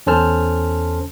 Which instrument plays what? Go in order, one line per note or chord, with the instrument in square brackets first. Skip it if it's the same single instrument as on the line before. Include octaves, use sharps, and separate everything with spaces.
[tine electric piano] E2 C#4 A4 C5 A5 F6